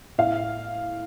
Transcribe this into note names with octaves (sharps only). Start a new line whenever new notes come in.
A2 F5